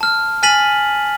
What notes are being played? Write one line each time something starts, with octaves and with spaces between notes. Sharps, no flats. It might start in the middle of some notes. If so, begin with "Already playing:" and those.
A5 F6
G#5 F6 A6 B6 D#7 F#7